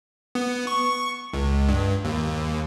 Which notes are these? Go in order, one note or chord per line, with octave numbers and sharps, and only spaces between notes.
B3
C#6
C#2
G2
D#2